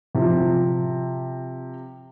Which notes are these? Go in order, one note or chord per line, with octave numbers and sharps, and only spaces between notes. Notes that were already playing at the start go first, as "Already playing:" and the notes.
C3 F3